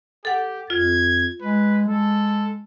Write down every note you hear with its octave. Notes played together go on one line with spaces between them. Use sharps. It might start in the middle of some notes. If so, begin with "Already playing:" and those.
G4 A4 F#5
F2 F4 G#6
G#3 B4
G#3 A4